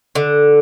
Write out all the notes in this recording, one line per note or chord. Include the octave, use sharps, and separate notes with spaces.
D3